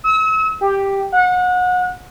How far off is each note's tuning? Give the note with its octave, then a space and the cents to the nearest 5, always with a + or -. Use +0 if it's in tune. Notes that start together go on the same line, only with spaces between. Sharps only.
E6 -40
G4 +5
F#5 -30